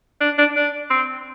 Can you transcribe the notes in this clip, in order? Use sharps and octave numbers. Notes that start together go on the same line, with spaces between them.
D4
D4
D4
C4